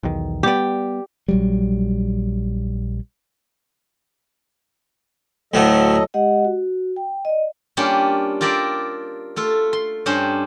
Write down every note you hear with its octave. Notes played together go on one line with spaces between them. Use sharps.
B1 E2 D#3
G3 B3 G4 D5
A#1 F#3 G3
D2 A2 F#3 A3 A4 D#5
G#3 G4 D#5 F#5
F#4
G5
D5 D#5
G3 A#3 C#4 D4 F4 G4
F4 G4 A#4 D5 E5
A3 F4 A4
C6
G2 C#4 D4 G4 C5